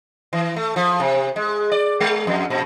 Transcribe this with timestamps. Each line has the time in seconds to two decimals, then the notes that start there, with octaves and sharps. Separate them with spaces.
0.33 E3
0.56 A3
0.76 F3
1.00 C3
1.36 G#3
1.72 D5
2.00 G#3
2.27 F2
2.50 A#2